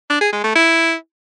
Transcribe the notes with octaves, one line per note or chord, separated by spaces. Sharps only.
D4
G#4
G#3
A3
E4